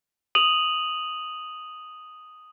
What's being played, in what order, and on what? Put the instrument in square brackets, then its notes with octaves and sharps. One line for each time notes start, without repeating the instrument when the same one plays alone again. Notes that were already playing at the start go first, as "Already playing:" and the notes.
[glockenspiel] D#6 D#7 F7 F#7